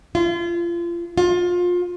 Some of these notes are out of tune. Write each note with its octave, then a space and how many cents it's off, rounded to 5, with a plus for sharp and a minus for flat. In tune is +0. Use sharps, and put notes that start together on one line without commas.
F4 -30
F4 +25